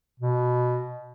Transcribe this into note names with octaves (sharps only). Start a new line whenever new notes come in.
B2